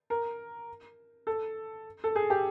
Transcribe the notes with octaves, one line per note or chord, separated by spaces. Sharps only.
A#4
A4
A4
G#4
G4